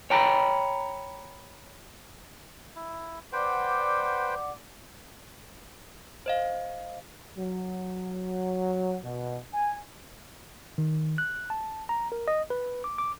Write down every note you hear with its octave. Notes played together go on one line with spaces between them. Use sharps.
C#5 G5 A#5 B5
E4
B4 C5 D5 F#5 G5 D6
C5 D#5 F5
F#3
B2
G#5
D#3
F#6
A5
A#5
A#4
D#5
B4
D6
D6